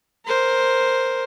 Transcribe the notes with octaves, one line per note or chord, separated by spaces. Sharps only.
A#4 C5